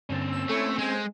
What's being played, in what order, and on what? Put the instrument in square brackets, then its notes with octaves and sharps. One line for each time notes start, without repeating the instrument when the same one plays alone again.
[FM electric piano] G2 D3 A6 [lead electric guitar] C4 C#4
[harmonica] E6
[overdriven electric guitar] A3 [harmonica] E4 C#5 [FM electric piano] A4
[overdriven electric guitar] G#3 [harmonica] C5 G#5